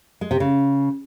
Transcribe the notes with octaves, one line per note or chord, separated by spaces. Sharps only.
G#3
C3
C#3